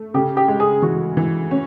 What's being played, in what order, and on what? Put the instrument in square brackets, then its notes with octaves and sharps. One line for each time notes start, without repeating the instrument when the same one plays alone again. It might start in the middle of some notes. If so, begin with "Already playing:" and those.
Already playing: [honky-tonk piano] A3
[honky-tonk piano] C#3 [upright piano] G4
[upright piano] G4
[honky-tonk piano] G#3
[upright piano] G#4
[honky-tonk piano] E3 [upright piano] F#4
[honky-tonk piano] E3
C#4